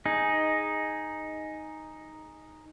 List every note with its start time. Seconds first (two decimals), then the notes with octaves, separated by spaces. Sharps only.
0.06 D#4 G#4